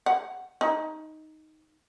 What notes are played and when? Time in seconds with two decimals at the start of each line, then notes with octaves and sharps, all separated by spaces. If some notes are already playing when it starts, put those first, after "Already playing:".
0.06 F#5
0.61 D#4